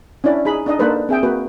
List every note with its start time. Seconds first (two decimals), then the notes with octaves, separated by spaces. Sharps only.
0.24 C#4 D4 E4 D5
0.45 D#4 G#4 B5
0.66 D4 D#4 D#5
0.79 A#3 D4 D#4 A4 B4 C5
1.09 C4 G#4 E5 G5
1.23 A#3 F#4 B4